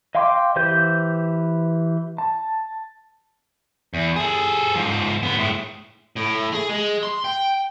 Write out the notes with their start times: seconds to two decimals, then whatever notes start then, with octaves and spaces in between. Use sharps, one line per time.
0.15 D#5 F5 G5 C6 D6
0.56 E3 G4 B4 C5 G6
2.18 A5
3.94 E2
4.16 G#4 A4
4.75 G#2 F3
5.23 D3 B3
5.38 A2 G#3
6.16 A2
6.53 G#4
6.69 G#3
7.03 C6
7.25 G5